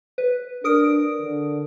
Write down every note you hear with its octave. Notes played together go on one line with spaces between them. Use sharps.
B4
D4 A#4 D#6 D7
D3